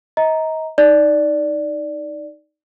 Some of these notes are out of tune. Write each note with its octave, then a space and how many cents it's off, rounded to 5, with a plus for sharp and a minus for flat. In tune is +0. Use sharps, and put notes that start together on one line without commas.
D#5 +35 A#5 +0
D#4 +0 D5 +0